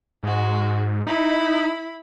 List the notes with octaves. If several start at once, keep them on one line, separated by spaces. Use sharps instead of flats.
G#2 G#3 F#4
D#4 E4 B5